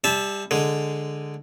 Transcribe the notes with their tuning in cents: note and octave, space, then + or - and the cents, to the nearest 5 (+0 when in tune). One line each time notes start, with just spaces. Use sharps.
G3 +20 E5 -5 A5 -20
D3 +0 G#3 -5